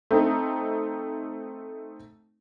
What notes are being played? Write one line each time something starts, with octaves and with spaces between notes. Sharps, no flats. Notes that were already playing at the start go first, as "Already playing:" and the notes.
A3 C4 D#4